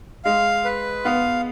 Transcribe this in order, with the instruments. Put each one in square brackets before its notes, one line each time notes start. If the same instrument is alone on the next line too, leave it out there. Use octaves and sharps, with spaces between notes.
[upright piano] G#3 [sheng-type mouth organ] F5
[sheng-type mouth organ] B4
[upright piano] B3 [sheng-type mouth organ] F5